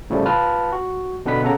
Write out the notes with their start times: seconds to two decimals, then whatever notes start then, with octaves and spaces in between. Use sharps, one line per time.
0.10 A2 C#3 F3 G3 A3
0.25 F4 B4 A5 F6
0.73 F#4
1.26 B2 D3 B3 B4 B6
1.43 C#3 A4 F#5 A#5